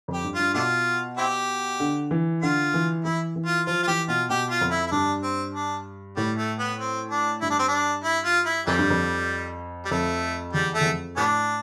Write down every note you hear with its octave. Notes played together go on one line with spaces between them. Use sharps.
F2
G4
G2
G2 F4
B2 A3 D4 F4
C4 E4 G4
D3
E3
D3 F4
E3
E3 E4
E3
F4
F3 F4
F4
E3 G4
B2 F4
B2 G4
F4
F2
E4
E4
G2 D4
C4
D4
A2 G3
A3
B3
C4
D4
G2 E4
D4
C4
D4
E4
F4
E4
F2 C3 E3 G3
G2
F2
G3
F2 A3
E2 G3
A3
E2
F2
A2 G3 B3 D4